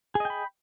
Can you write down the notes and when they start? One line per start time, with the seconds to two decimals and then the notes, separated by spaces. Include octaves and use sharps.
0.15 G#4
0.20 D#5
0.25 G5
0.30 B5